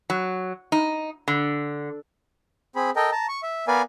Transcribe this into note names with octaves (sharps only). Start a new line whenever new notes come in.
F#3
D#4
D3
C4 G#4 B5
A4 A#4 D#5 G5
A5 A#5
C#6
E5
B3 A#4 B4 D5 F5 G#5